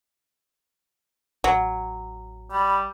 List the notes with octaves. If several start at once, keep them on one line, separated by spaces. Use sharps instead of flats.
A1 F#3
G3 B5